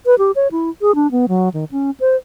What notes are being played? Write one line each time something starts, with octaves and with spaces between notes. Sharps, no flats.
B4
G4
C#5
E4
G#4
D4
B3
F#3
D#3
C#4
C5